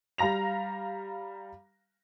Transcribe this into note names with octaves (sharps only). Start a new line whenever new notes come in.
G3 F5 A#5 A#6 F7